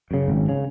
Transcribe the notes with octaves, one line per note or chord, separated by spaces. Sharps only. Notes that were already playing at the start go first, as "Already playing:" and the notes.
F#2 C#3
G#1
C#3